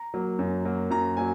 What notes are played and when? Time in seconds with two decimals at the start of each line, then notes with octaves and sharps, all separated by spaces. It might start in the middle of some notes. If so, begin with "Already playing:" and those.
Already playing: A#5
0.14 F#3 A#3
0.39 F#2
0.65 F#3 A#3
0.90 F#2 A#5
1.17 F#3 A#3 G#5